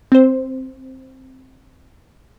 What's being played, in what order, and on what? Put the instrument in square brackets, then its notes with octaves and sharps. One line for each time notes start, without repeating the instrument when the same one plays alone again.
[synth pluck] C4 C5